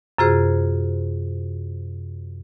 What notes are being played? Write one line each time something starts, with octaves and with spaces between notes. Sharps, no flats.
F#2 C3 F4 F#4 G#4 C5